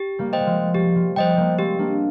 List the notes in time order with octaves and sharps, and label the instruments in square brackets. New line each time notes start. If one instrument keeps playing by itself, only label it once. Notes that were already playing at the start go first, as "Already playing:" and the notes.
Already playing: [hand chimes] G4
[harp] G3 A#3
[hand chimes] C5 D#5 G5
[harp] G3
F3 G#3
[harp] G3 [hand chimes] G4
[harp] F3
[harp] G3 [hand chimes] C5 D#5 G5
[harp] G3 A#3
[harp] G#3 C4 [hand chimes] G4
[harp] A#3 D4